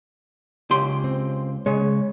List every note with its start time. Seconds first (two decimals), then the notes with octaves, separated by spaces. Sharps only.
0.70 C#2 G4 C6
1.04 C4
1.66 C#3 G#3 G#4 C#5